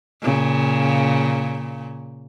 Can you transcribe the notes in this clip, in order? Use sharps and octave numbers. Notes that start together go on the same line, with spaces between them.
A#2 C#3